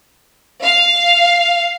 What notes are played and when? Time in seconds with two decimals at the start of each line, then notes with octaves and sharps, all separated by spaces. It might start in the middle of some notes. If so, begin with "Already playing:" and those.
0.64 F5